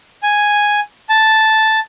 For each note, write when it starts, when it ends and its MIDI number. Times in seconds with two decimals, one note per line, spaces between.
0.23 0.80 80
1.09 1.79 81